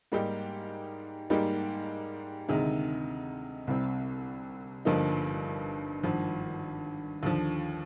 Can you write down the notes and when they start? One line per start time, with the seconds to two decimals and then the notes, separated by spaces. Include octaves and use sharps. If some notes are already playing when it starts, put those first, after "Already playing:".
0.12 G#2 G3 A#3 D#4 G4
1.30 G#2 G3 A#3 D#4 G4
2.49 D2 C3 D#3 G#3
3.67 C2 C3 G3 C4
4.85 G1 G2 F3 A#3 D#4
6.03 G#1 G2 F3
7.23 D#2 D3 F3